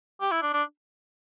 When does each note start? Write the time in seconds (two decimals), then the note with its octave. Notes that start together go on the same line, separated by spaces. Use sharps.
0.21 G4
0.31 E4
0.42 D4
0.53 D4